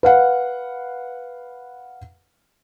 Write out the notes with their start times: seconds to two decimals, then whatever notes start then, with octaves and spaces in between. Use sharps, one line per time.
0.03 B4 F5 F#5